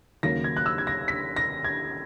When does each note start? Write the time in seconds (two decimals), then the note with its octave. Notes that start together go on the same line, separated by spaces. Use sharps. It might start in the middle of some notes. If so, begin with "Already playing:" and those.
0.23 D#2 C#3 F#3 A#3 A#6
0.44 G#6
0.57 F#6
0.66 E6
0.78 G#6
0.87 A#6
1.08 B6
1.36 A#6
1.64 G#6